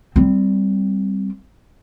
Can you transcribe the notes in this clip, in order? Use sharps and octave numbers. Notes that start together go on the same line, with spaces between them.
G3 C4